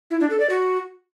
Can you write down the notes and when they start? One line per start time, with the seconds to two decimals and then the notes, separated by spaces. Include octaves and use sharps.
0.11 E4
0.20 D4
0.30 A4
0.40 D5
0.50 F#4